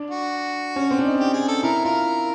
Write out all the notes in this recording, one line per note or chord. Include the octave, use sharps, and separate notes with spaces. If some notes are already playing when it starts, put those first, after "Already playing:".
Already playing: D4
F#4
C#4
C4
D4
D#4
G4
G#4
A4
E4 A#4
F4 A#4